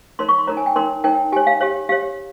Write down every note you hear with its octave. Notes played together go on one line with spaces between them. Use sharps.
D#4 A#4 C#5 C6
C#6
C6
D#4 A#4 C#5 A#5
G#5
G5
D#4 A#4 C#5 C6
D#4 A#4 C#5 G5
G4 C#5 G#5
F5
G4 C#5 F5
G4 C#5 F5